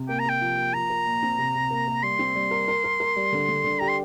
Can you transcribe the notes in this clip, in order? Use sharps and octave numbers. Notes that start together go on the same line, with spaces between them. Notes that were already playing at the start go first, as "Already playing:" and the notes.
Already playing: C3
A#3 G5
A#5
A#3 G5
F3
A#3
F3 A#5
A#4
A#2
C4
C3
C3
A#3
A#3
G3 C6
C4
G3
A#4
A#4
A#4
A#4
G3
D3
D3
D3
G4 A#5
C6